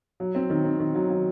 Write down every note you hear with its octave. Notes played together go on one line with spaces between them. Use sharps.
F#3
C4
D#3
C4
D#3
F#3
F#3